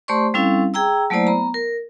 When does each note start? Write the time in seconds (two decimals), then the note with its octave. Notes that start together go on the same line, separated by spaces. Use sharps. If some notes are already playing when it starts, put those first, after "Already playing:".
0.08 A3 G4 C5 D5 C6 C#6
0.34 G3 C4 C#4 E4 A4 F5
0.74 G#4 G5 A#5 E6
1.10 F#3 A3 A#3 E4 C5 D5
1.27 B3 A#5
1.54 A#4